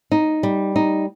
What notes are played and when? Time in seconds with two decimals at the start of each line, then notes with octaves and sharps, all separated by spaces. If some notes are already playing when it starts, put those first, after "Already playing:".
0.12 D#4
0.43 G3
0.76 D#4